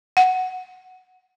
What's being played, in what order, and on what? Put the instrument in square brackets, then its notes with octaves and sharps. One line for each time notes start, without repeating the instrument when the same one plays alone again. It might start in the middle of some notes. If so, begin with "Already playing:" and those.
[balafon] F#5